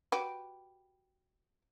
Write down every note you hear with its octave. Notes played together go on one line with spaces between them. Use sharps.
F#4 G4 B4